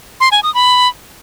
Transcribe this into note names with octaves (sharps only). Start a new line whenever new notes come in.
C6
G#5
D#6
B5